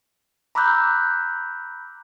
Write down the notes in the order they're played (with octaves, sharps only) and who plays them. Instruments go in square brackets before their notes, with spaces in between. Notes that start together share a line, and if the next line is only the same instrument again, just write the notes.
[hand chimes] A#5 B5 D6 E6 F#6 G6